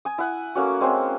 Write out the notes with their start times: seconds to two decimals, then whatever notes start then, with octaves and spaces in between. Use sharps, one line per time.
0.05 G#5 D#6
0.18 E4 F#5
0.55 A3 A#3 C#4 F#4
0.81 G#3 C4 C#4 C5